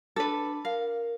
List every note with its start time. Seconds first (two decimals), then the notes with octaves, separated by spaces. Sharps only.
0.16 D4 A4 B4
0.65 A#4 F5